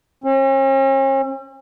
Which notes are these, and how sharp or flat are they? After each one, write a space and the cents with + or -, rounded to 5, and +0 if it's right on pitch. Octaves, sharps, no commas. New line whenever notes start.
C#4 -45